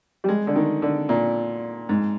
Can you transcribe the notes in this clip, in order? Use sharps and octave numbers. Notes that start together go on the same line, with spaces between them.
G3
G#3
D3
D#3
D3
A#2
G#2